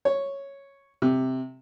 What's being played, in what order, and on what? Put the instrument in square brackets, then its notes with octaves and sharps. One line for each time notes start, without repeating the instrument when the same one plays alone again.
[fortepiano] C#5
C3